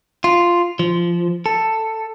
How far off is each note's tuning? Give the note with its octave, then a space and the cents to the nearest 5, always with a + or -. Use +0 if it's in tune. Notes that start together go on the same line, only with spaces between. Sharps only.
F4 -5
F3 -15
A4 +10